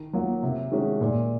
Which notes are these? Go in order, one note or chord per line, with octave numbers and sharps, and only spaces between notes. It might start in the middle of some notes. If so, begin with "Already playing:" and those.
Already playing: D#3
F#3 A#3 F4
C3
D#3 G#3 C#4 F#4
A#2